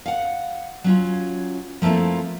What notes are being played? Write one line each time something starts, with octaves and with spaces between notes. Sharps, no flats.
F5 F#5
F#3 C#4 F4
F3 A3 A#3 C4 E4